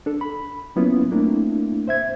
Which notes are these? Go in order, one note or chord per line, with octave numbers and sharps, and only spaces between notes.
D4 A4
B5
F#3 A#3 B3 C#4 E4 F4
A3 A#3 C4 D4 E4
C5 E5 G#6